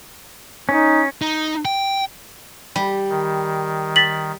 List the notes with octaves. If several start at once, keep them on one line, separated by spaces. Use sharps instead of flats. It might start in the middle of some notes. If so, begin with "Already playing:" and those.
C#4 D#4
D#4
G5
G3
D#3
A6 B6 F#7